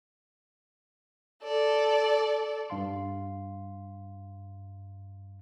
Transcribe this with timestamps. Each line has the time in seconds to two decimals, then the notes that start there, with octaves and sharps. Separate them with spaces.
1.43 A4 D5
2.70 G2 F5 C6